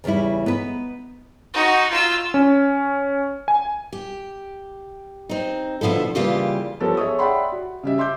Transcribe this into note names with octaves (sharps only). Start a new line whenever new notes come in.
E2 C#3 E3 G3 E4
B3 D#4 B4
D#4 F#4
F4 E6
C#4
G#5
G4
C4 D#4
D2 B2 F3 E4 A4
C#3 E3 G3 A#3 F4 G4
F3 G3 B3 A4 A#4 C#5
G#4 C#5 E5 C#6 D#6
D5 E5 F#5 G5 B5 C6
F#4
C#3 G3 E5
E5 C6 D6 G6